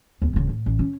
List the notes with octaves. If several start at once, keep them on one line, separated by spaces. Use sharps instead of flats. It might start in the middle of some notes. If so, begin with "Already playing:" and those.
D#2 B3
D1 C#2
A2
A1
C#4